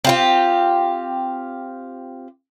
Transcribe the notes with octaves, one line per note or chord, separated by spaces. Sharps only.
C4 F4 G4